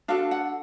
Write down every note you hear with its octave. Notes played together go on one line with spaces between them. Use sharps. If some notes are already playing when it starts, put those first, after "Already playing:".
D4 F#4 A4 F5
F#5